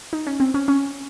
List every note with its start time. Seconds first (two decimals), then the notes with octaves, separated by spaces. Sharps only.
0.13 D#4
0.27 C#4
0.40 C4
0.54 C#4
0.68 C#4